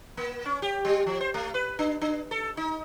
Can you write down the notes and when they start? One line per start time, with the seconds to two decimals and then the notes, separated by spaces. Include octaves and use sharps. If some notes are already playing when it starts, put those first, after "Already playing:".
0.17 A#3
0.45 C#4
0.62 G4
0.85 G3
1.06 F3
1.21 C5
1.34 A3
1.54 B4
1.79 D4
2.01 D4
2.31 A4
2.57 D#4